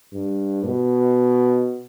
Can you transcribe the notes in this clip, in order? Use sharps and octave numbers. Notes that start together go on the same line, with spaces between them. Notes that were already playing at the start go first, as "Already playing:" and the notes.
G2
B2